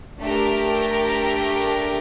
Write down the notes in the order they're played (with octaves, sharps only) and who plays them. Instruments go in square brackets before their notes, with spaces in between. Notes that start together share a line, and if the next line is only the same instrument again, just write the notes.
[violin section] A3 D4 G4 A#4